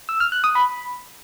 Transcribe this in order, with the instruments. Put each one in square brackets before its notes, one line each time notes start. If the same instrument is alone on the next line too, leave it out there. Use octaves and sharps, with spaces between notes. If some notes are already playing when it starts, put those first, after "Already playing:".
[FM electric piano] E6
F6
F#6
D#6
B5